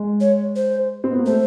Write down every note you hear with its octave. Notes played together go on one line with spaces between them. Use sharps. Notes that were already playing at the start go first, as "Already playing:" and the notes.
Already playing: G#3
C#5
C5
C4
B3
A#3
A3 C5